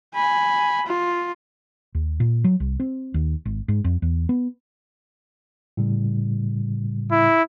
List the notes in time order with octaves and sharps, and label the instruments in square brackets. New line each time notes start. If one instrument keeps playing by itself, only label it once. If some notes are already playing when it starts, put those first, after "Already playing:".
[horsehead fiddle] G#5 B5
F4
[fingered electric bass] D#2
A#2
F#3
C2
C4
D#2
G#1
G#2
F2
E2
B3
[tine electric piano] A2 C#3 G3
[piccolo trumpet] E4